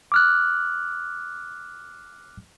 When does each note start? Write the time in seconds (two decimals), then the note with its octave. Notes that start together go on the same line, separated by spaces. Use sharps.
0.12 D6 F6 F#6